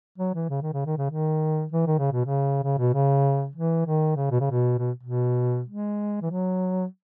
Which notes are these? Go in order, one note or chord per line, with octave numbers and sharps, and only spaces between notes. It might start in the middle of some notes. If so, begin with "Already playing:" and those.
F#3
E3
C#3
D#3
C#3
D#3
C#3
D#3
E3
D#3
C#3
B2
C#3
C#3
B2
C#3
E3
D#3
C#3
B2
C#3
B2
B2
B2
G#3
E3
F#3